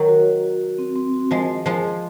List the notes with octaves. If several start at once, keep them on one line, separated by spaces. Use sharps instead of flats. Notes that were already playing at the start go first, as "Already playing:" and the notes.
Already playing: D#3 F#3 C#5
F#4
F#4
F#4
F#4
C4
C4
F#4
F3 G#3 D#5
D#5
F3 G#3 G#4
G#4